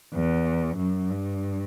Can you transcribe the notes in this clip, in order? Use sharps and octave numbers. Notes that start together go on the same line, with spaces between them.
E2
F#2
G2